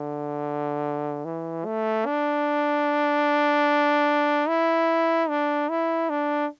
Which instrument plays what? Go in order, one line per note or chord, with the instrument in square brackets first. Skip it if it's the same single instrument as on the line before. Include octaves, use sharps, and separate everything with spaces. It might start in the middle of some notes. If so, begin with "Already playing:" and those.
Already playing: [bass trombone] D3
E3
A3
D4
E4
D4
E4
D4